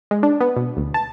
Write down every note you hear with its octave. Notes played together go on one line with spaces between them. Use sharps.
G#3
D4
B3
B2
D2
A5